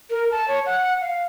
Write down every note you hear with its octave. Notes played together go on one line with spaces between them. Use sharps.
A#4
A5
C#5
F#5
F5